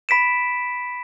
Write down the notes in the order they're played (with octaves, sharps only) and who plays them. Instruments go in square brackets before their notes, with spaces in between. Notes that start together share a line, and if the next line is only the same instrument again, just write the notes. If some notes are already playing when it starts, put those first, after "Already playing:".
[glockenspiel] B5 B6 D7 E7